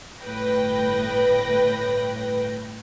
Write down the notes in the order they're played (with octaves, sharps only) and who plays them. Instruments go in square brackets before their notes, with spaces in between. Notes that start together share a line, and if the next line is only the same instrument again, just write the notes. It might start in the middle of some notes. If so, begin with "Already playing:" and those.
[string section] G1 A2 B4 G5 A#6